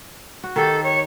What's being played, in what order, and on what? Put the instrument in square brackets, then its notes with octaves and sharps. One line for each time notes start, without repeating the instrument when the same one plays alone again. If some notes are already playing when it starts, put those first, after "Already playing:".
[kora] F#4
[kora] D#3 G4 [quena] A4
[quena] C#5